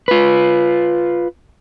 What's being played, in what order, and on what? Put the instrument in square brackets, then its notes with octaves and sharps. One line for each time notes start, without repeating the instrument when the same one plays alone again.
[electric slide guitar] F4 B4